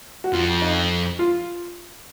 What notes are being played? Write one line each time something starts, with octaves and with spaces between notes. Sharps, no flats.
F#4
F2 F4
D#4
F4